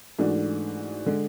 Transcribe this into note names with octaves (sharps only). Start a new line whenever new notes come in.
G#2 E3 A3 D4 F#4
D3 G#3